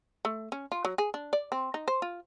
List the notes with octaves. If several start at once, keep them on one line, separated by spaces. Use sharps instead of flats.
A3
C#4
F4
F#3
G#4
D4
D5
C4
D#4
C5
F4